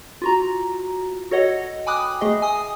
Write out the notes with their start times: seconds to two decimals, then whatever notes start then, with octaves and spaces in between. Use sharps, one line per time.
0.22 F4 F#4 A#5
1.31 F#4 A4 C#5 D#5 F#5
1.86 G5 G#5 B5 D6 D#6 F#6
2.21 A3 G#4 D#5
2.42 G#5 D#6